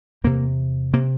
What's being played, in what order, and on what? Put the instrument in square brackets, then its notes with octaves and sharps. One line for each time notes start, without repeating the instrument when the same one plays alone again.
[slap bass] E2 C3 A#3
C3 A#3